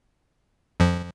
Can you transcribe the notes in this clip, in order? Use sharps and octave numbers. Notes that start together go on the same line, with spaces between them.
F2 F3